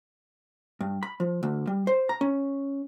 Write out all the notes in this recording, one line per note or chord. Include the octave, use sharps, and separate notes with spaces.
G2
B5
F3
D2
G3
C5
A#5
C#4